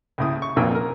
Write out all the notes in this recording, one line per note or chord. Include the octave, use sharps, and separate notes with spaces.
C#2 A2 D#6
C#6
B1 F2 A#2 G5 E6
A#4